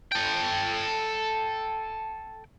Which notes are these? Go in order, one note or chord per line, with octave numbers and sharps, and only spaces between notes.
A4 G5